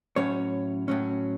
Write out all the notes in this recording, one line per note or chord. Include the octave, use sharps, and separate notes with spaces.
A2 F#3 C#4 C#5
A2 F#3 C#4